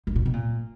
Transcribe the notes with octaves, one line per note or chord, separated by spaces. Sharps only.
G#2
A#2
B2
A#2